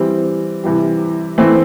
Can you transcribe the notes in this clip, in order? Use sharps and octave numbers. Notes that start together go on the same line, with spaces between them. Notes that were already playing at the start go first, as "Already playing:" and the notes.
Already playing: E3 G3 C4
C3 E3 G3
E3 A3 C4